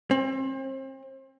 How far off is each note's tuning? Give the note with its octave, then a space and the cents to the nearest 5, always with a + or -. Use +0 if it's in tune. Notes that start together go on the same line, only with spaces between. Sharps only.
C4 +35